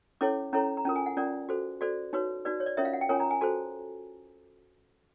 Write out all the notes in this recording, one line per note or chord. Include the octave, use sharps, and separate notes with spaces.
C#4 E4 A4 C#5 D6
C#4 E4 A4 C#5 A#5
A#5
C#4 F4 A#4 A5
G#5
F#5
C#4 F4 A#4 D5
F#4 A4 C5
F#4 A4 C5 D5
D#4 F#4 B4 C#5
D#4 F#4 B4 D5
C#5
D5
C#4 F4 A#4 C#5 E5
F5
F#5
G5
C#4 F4 A#4 C#5 G#5
A#5
G#5
F#4 A4 C5 A5